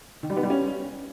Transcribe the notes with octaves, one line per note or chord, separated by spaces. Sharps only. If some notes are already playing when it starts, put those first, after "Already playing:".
D#3
G3
B3
G3
C#4